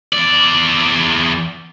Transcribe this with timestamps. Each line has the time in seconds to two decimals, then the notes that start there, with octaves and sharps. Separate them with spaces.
0.13 E2 D5